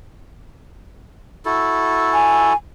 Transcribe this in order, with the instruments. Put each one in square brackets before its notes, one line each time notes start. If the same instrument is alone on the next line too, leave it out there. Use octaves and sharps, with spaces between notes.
[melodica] E4 F#4 A4
[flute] G#5